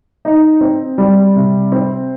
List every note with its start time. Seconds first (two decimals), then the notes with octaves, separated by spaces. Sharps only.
0.25 D#4
0.61 C4
0.98 G3
1.36 C3
1.72 C4